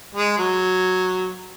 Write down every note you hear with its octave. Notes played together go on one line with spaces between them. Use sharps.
G#3
F#3